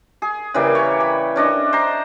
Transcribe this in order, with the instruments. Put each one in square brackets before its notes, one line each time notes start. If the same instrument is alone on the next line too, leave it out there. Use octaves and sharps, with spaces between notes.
[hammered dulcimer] G#4
C#3 E3 G3 A#3
C#5
B5
C#4 D4 D#5
C5 A#5